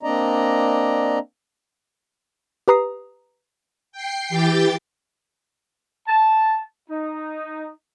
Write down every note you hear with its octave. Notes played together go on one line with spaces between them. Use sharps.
A#3 C4 D4 D5 D#5 A#5
G4 B4 A#5 D#6 C7
G5 C7
E3 G4 G5 G6 A6
A5
D#4